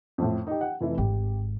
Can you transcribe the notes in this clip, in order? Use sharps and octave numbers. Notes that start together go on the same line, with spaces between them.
F2 A2
D#4 G4
F#5 G5
F1 E3 E4
G#1 G4